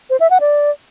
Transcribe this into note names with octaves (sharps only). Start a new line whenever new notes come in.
C5
E5
F#5
D5